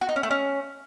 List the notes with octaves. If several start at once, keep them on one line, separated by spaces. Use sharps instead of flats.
F#4
D#4
C#4
A3
C#4